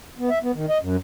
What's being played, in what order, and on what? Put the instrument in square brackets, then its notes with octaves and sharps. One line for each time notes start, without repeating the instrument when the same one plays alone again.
[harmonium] B3
E5
B3
D#3
D#5
F#2